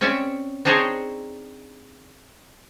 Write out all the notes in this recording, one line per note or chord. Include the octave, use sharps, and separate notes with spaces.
C4 C#4 C#5 D5 E5
C4 D4 D#4 G#4 C5 C#5